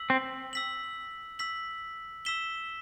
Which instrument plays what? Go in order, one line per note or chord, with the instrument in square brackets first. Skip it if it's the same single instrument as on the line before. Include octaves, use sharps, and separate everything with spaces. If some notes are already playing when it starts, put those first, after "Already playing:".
Already playing: [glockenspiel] E6 B6 F#7
[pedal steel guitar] C4
[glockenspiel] E6 B6 F#7
E6 B6 F#7
E6 B6 E7 G7